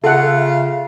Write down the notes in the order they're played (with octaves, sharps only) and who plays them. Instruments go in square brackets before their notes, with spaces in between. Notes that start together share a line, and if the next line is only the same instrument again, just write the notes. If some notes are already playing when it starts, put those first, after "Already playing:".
[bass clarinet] C#3 [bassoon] F4 [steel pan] A4 F#5 [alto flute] E5